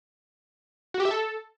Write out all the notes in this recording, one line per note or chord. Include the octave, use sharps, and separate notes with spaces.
F#4
G4
E5
A4